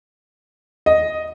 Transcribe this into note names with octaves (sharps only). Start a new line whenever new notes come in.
D#5